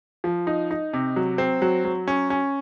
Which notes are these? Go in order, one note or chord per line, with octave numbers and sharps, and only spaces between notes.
F3
D#4
D#4
C3
F#3
C4
F#3
F#3
C#4
C#4